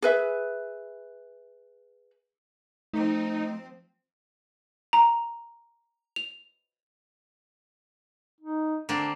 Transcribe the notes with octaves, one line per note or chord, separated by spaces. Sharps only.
G#4 B4 E5
F3 A3 C4 D#4
A#5
F7
D#4
D3 A#3 C4 D4